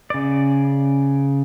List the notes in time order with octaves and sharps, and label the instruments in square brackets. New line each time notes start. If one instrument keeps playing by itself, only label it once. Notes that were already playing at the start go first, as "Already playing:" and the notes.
[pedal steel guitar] C#3 D5